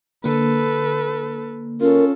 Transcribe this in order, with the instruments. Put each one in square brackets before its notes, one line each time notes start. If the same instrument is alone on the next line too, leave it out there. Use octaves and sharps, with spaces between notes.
[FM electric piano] D3 A#3 [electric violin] A4 B4
[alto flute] C#4 [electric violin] F4 A4 [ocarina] A#4